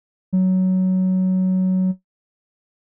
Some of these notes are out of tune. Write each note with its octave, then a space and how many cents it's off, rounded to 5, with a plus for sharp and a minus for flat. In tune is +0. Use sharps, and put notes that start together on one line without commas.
F#3 +10